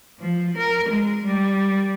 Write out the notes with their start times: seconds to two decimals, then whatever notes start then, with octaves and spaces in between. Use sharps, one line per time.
0.20 F3
0.57 A#4
0.89 G#3
1.26 G3